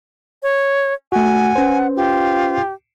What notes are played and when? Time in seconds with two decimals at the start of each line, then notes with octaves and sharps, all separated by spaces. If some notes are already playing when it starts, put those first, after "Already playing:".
0.43 C#5
1.12 A3 F#4 F#5 G#5
1.56 C#4 B4 C5
1.96 F4 G4